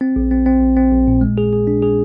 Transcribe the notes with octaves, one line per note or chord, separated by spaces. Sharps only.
C4
A#1
C4
C4
A#1
C4
A#1
A#2
G#3
G#4
G#4
D4
G#4